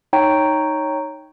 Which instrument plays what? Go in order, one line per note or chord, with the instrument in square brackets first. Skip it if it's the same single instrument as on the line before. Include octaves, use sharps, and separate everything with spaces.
[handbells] D#4 C#5 G5 A#5